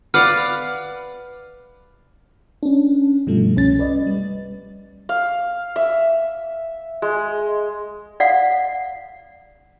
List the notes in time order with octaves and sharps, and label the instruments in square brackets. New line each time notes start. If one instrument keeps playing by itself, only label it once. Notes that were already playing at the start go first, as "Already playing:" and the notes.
[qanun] B4 D5 F5 [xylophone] F#5 D6 C7 [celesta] F6
[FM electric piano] C#4 D4
G2 B2 F3 G3 A3
C2 C#4 A6
B4 D5 D#5
G3
[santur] F5
E5
G#3
[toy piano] D5 F5 F#5